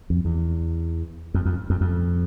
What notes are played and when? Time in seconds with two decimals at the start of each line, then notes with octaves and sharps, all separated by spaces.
0.10 F2
0.25 E2
1.34 F2
1.45 F2
1.70 F2
1.81 F2